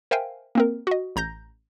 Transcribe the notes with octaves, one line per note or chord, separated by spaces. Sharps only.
A#4 C5 E5 F5 G5 G#5
A#3 C4 A#4
F#4 D#5
A1 A#5 G6 A#6